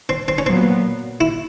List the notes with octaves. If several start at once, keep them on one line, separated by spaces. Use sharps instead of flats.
C4
C4
C#4
A#2 F#3 B3 C4
E4